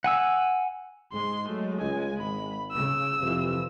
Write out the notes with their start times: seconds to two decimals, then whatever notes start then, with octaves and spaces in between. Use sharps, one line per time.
0.04 F#5 G#5 E6
1.13 G#2 G#3 C6
1.49 F#3 A3
1.81 C#2 G#5
2.18 G#1 B5
2.72 C#3 E6
3.21 F2 C3 E3 F3